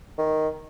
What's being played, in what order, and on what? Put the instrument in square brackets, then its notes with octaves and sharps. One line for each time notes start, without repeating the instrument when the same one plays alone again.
[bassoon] D#3